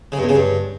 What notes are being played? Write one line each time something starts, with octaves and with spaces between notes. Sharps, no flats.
C#3
G2
E2
C#3
G2